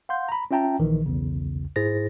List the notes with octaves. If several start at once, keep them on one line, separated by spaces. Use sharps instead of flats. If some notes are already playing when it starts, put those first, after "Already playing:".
F5 F#5 C6 G6
A#5 B5
C#4 F4 E5 G5 A5 A#5
A#1 D#3 E3
B1 E2 C#3
G#2 E4 G#4 C5 A6 A#6